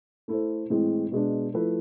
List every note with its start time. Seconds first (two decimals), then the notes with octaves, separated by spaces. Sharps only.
0.28 A3 E4 A4 C5
0.70 A2 E3 G#3 C4
1.11 B2 G#3 D4
1.54 F3 A3 E4 B4